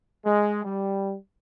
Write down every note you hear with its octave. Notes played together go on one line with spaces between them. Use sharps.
G#3
G3